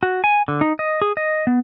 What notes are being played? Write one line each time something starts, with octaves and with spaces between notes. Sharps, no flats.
F#4
G#5
D3
D#4
D#5
G#4
D#5
B3